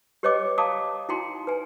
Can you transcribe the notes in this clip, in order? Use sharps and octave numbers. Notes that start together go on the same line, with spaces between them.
G4 B4 C#5 D#5 G5 D6
F5 A5 A#5 D6 D#6
D#4 E4 F#4 G5 A#5 C6
B4 G#5